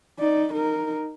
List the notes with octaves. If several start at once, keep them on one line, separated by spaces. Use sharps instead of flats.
D#4 D5
D#4 A#4